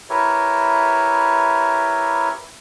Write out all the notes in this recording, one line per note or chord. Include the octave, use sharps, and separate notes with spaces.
E4 G4 A#4 B4 C#5 E5